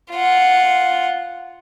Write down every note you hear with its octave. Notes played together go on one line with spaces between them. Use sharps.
F4 F#5